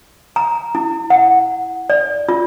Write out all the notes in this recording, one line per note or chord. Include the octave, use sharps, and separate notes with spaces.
A#5
E4
F#5
D5
F4